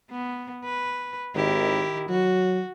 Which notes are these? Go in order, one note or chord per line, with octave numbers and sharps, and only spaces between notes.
B3
B4
G#1 D#3 E4 G4
F#3 F#4